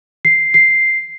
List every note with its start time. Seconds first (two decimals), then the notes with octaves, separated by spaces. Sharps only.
0.25 C7
0.54 C7